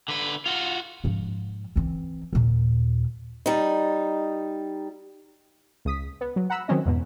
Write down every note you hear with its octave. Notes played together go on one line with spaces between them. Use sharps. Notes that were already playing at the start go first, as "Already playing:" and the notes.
D3 B4
F4 F#4
G#2 F3
E3 C4
D#2 A#2
G3 D#4
C#2 D#6 B6
B3
F#3
F#5 A#5 B5 E6 F#6
D#3 F#3 C4 C#4 D#5
E2 G#2 B2